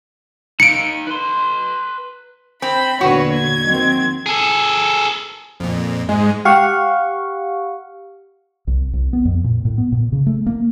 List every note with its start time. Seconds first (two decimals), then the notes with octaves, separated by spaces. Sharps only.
0.60 D#4 F5 C#7 D7
1.07 B4 C6
2.62 C4 B5
3.01 E2 A#2 D3 F#4 B4 C#5
3.32 G#6
3.65 D#3 F#3 C4
4.26 G#4 A4
5.60 F2 A#2
6.09 G#2 G#3
6.45 G4 F5 F#5 C#6
8.67 C2
8.93 C2
9.13 B3
9.25 F2
9.44 A#2
9.65 A2
9.78 B3
9.92 A#2
10.12 C#3
10.26 A3
10.46 A#3